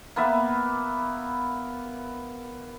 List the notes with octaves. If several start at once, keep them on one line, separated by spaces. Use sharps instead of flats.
A#3 B3 B4 E5